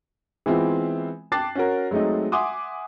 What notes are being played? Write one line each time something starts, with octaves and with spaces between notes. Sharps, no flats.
E3 G#3 B3 C4 E4 F4
G5 A5 D6 F#6 A6 C7
C#4 F#4 A#4
F#3 G#3 A3 C4 D#4
E5 F#5 G#5 C6 D6 D#6